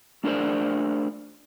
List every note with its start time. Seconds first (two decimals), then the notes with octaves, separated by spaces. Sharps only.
0.24 A3 D4 G#4 A#4 C5 D5